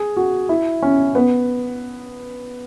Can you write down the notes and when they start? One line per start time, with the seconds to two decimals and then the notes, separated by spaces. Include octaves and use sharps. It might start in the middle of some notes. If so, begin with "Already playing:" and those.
Already playing: G#4
0.17 F#4
0.49 E4
0.82 C#4
1.15 B3